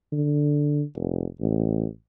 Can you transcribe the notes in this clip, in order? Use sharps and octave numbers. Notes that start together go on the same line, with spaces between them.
D3
F1
A1